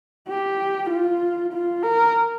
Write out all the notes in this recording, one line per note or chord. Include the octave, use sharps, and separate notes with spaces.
G4
F4
F4
A#4